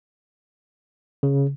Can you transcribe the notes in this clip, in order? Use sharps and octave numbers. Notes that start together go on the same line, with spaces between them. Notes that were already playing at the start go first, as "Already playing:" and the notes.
C#3